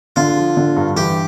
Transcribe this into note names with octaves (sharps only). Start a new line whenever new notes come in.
D3 F4
F3
D3
G2
E3 G4